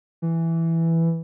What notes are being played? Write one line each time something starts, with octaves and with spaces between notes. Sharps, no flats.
E3